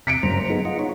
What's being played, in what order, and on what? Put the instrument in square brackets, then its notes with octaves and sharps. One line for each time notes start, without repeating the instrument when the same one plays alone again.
[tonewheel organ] C3 [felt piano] B6 C#7 D7
[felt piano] F#1 [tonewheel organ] G2 C5 A#5
[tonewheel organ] B3 D#4 [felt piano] G#4
[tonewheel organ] F4 D#5 F#5
D#4 C#5